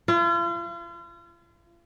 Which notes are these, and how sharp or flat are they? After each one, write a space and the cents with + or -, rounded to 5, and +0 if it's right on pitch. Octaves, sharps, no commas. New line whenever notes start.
F4 -40